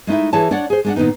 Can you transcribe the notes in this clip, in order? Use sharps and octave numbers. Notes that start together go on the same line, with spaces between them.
G#3 A3 D#4 E4 E5
E3 E4 G#4 C#5 A5
D4 C#5 D5 F#5
G#4 C5
G#3 D4 F#5
A#2 D#3 G#3 B3 D#4